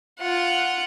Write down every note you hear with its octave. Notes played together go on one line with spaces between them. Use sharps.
F4 F#5